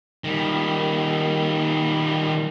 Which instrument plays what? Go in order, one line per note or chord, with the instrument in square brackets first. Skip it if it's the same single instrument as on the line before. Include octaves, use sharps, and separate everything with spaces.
[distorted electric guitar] D#3 G3